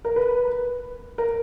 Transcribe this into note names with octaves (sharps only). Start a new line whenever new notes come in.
A#4
B4
A#4